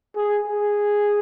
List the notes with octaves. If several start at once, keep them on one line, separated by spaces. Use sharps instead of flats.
G#4
G#4